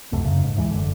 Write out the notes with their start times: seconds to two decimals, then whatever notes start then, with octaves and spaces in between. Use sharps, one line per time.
0.12 D#1 C2 F#2 A3
0.25 F#2 C#3
0.43 G#2
0.56 D#2 G#2 E3 G#3
0.71 F#1 D3